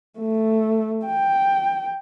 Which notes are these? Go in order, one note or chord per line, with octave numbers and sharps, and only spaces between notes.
A3
G5